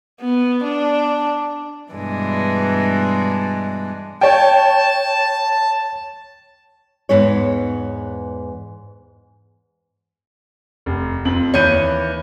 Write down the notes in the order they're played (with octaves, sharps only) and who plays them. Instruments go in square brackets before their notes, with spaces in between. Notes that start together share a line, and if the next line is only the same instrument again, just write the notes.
[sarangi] B3
D4
[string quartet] G2 B2 E3 G#3 D4
[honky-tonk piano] C#5 G5 [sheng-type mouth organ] A5
[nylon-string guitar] E2 G#2 B3 D#4 C#5
[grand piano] F1
F2 F#7
[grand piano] D#2 G6 D#7 [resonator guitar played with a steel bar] E3 C#5